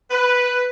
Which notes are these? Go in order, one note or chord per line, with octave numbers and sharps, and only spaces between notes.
B4